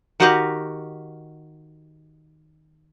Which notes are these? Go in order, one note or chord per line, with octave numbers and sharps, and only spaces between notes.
D#3 F#4 G4 D#5 F5 F#5